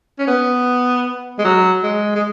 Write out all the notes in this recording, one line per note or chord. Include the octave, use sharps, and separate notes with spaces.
C#4
B3
G#3
F#3
G#3
G#3